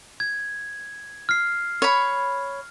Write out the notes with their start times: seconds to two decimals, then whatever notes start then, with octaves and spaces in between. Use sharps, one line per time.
0.20 G#6
1.29 F6 C7
1.82 C#5 B5